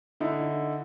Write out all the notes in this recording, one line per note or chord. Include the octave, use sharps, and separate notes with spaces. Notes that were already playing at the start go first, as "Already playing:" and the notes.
D3 D#4 E4